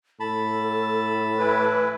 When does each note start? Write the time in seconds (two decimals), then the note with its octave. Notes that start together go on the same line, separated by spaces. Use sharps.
0.20 A2 A4 A5 B5
1.39 E3 E4 B4